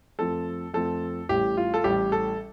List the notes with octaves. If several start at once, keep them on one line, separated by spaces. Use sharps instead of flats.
F2 F3 A3 C4 A4
F2 F3 A3 C4 A4
A1 A2 G3 G4
F4
A4
A1 A2 G3 G4
A4